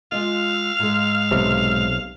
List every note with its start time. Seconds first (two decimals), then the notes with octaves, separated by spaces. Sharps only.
0.12 G#3 F4 D#5 F5
0.79 G#2 G#3
1.31 B1 C3